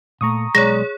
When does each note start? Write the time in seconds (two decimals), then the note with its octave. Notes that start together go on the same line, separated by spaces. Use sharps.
0.21 A#2 A3 A#5 C#6 D#6
0.55 B1 G#3 G#4 C#5 D5 A#6